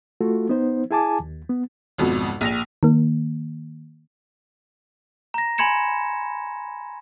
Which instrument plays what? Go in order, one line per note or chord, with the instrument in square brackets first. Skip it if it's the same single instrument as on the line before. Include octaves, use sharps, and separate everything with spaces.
[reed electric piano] A3 F4 F#4 A4
B3 D#4 C5
E4 G#4 G#5 A5 D6
D#2
B3
[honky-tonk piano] G#1 F2 B2
A#1 A#6 F7
[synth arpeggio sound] D#3 A#3
[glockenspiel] A#5 A#6
G#5 B5 C6 G#6 C#7 E7